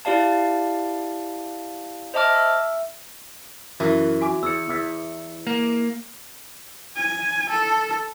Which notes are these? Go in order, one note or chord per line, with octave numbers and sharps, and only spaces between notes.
E4 G4 D5 F5 A5
C5 D#5 E5 A5 D6 F6
E5 E6
F#2 E3 E4 A#4 E5
F#4 G#5 D6
E2 E6 C#7
E2 E5
A#3
G#5
A4